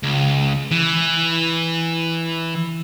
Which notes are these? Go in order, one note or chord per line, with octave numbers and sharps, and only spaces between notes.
C#2
E3